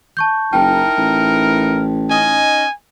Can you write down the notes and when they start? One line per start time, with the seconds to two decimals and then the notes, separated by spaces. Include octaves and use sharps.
0.17 A5 C#6 G6
0.53 F#1 D#4 E4 A#4 G5 A5
0.98 A1
2.10 C#4 D#4 D#5 G#5